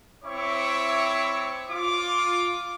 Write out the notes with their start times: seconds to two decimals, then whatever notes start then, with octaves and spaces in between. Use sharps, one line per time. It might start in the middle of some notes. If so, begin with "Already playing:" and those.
0.24 C4 E4 C#5 E5 C#6 D6
1.71 F4 D6